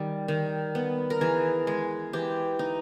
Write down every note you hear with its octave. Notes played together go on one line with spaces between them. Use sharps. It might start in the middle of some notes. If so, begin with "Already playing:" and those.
Already playing: D#3 G3
D#3
B3
A#4
E3 G#4
G#3
E3 G4
D#4